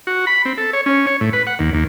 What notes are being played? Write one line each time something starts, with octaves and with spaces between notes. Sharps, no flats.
F#4
B5
C4
A4
C#5
C#4
C#5
A2
B4
F#5
D#2
D#2